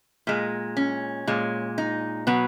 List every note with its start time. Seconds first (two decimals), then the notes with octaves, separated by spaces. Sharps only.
0.27 A#2 G#3
0.77 C#4
1.27 A#2 G#3
1.78 D#4
2.27 B2 F#3 B3